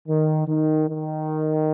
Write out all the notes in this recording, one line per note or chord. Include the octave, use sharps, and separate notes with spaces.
D#3
D#3
D#3